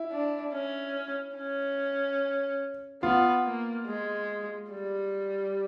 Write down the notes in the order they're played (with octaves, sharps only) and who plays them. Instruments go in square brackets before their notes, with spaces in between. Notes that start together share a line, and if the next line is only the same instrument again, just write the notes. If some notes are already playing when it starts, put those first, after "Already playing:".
Already playing: [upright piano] E4
[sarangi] D4
C#4
C#4
[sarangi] B3 [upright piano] F4
[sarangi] A#3
G#3
G3